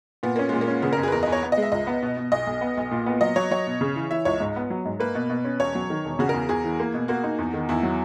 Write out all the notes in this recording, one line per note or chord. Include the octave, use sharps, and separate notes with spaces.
A#2 B3
A#3 C#4
A#2 G#3
A#3
C#4
C#3 B3
A#4
F#1 G#4
B4
E2 A#4
D#5
E2
C#5
B3
D#5
G#3
E5
C#2 D#5
B3
B2
B2
B1 D#5
B1
B3
B1
A#2
B3
F#3 D#5
F#3 C#5
F#3 C#5
B2
C#3
E3
E3 E5
C#2 C#5
G#2
B3
F#3
G#2
A#3 B4
B2
B2
C#4
E1 C#5
F#3
D#3
E1
C#3 F#4
A#4
E2
E2 G#4
E3
A#3
B2
A#3 F#4
D#4
E2
D#3
E2 E4
F#3